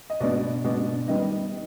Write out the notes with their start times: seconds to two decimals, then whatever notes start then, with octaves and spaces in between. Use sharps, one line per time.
0.10 D#5
0.20 B2 G#3 B3 D4 D5
0.64 B2 G#3 B3 D4
1.08 D#3 G3 B3 D#4 D#5